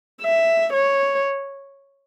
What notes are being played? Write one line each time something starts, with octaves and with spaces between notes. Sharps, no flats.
E5
C#5